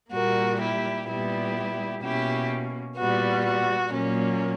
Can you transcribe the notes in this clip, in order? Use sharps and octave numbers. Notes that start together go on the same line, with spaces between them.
A#2 G3 A#3 F#4 A#4
E4 G4
A#2 G3 B3 E4 G4
B2 A#3 C#4 E4 G4
A#2 G3 B3 F#4
F#4
A#2 F#3 A#3 C#4